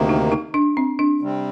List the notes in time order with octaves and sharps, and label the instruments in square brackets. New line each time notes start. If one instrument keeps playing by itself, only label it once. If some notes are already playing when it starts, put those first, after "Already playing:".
Already playing: [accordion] D2 C3 D#3 A#3
[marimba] D#4
D#4
D4
C4
D4
[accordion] C3 G3 C4